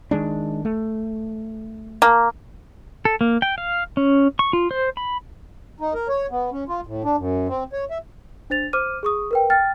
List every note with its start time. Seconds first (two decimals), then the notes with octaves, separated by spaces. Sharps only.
0.11 D#3 G#3 D4
0.65 A3
2.02 A#3
3.05 A4
3.21 A#3
3.42 G5
3.58 F5
3.97 C#4
4.39 C#6
4.53 F4
4.71 C5
4.97 B5
5.80 D#4
5.94 A#4
6.08 C#5
6.31 B3
6.52 C#4
6.69 F4
6.87 A2
7.04 D4
7.17 F#2
7.48 C4
7.73 C#5
7.90 E5
8.50 D4 C5 A6 F7
8.73 C5 D6 F6 D#7
9.03 G#4 C#6 D#6
9.31 A#4 B4 G5
9.50 G5 F6 A6